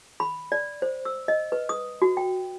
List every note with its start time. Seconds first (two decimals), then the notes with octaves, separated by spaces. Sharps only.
0.20 B5
0.52 D5
0.82 C5
1.05 E6
1.28 D#5
1.52 B4
1.69 D#6
2.02 F#4
2.17 G5